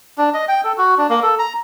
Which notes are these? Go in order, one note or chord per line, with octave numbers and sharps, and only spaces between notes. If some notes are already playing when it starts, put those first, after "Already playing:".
D4
D#5
G5
A4
F#4
D4
A#3
A4
A#5